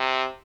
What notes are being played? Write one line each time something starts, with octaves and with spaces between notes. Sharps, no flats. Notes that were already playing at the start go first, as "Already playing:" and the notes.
Already playing: C3